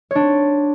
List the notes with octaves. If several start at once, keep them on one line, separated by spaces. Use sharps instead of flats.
C4 D4 C#5